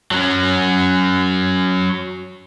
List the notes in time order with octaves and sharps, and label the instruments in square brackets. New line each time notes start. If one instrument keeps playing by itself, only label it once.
[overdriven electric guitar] F#3 C#4